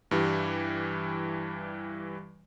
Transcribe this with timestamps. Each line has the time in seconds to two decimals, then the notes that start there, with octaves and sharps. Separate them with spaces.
0.11 G2 E3 G3